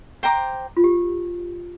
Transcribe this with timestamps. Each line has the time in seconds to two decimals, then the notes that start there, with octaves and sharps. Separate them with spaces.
0.23 C5 G5 A#5 D6
0.77 F4
0.84 G4